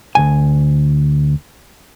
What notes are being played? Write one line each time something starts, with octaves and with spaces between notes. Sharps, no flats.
D2 G#2 G#5